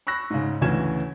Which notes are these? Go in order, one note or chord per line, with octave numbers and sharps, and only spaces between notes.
B5 C#6 E6 F#6 A#6
G#2 C#3
D2 C#3 E3 C#4 G#6 E7